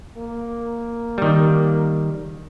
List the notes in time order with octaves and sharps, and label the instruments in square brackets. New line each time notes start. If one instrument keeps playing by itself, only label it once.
[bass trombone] A#3
[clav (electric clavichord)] D#3 G3